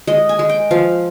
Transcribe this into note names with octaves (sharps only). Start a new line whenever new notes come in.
G#3 D#5
G#5
G#3
G5
F3 F5